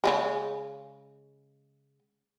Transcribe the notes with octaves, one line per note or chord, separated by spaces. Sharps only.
C#3 G3 G#3